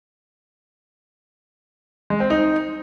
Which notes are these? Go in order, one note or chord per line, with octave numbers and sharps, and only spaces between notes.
G#3
C4
D#4